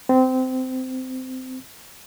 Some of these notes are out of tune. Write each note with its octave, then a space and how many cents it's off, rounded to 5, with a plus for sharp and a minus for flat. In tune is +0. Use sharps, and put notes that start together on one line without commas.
C4 -20